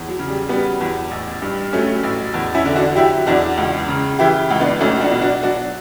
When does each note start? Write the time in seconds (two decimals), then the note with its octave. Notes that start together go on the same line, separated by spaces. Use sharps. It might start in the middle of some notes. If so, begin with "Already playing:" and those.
Already playing: E2
0.08 F#3
0.19 C#3
0.28 G3
0.49 F#3 G3 B3
0.81 E2
1.11 A1
1.42 G2
1.73 F#3 A3 C#4
2.03 A1
2.34 E2
2.54 C#4 E4
2.65 D3
2.75 D4 F#4
2.95 F#3 E4 G4
3.26 E2 D4 F#4
3.58 C#2
3.88 C#3
4.19 E3 E4 G4
4.50 C#2
4.60 B3 D4
4.80 B1 A3 C#4
5.01 D4 F#4
5.11 B2
5.21 D4 F#4
5.43 F#3 D4 F#4